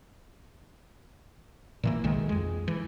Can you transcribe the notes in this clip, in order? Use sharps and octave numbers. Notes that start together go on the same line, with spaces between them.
A#2 E3 A#3
B1 D#3 G#3
F2 G#3
E3